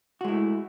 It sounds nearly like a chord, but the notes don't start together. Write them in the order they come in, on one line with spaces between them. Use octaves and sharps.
F#4 G#3 E4 A3